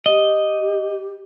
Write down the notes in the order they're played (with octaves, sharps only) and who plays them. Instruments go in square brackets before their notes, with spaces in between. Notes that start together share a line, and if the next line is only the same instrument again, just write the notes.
[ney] G4 [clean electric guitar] D#5